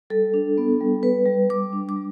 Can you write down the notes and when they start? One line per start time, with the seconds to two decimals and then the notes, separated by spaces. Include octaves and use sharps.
0.10 G3 A4
0.34 D4
0.58 B3
0.81 G3
1.03 G3 B4
1.26 G3
1.50 G3 D6
1.73 D4
1.89 D6
1.96 G3